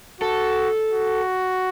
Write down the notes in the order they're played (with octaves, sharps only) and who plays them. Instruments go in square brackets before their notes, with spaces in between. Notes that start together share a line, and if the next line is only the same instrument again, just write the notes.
[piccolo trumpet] F#4 [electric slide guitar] A4
[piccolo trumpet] F#4